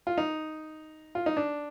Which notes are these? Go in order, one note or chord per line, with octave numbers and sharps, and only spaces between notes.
F4
D#4
F4
D#4
D4